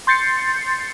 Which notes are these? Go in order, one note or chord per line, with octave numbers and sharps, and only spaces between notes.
C6 G6 A6 C7 C#7